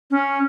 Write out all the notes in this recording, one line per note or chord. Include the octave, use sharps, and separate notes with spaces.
C#4